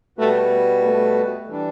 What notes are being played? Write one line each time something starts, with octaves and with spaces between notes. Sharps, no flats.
B2 G3 A3 B3 F#4 B4
A3
E3 G3 D4